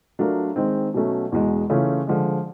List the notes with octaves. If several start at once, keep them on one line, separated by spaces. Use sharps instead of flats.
F#3 A3 D4 F4 A#4
D#3 G#3 C4
B2 F#3 A3 C#4
E2 B2 G#3
C#3 E3 A3 C#4 F4
D3 F3 G#3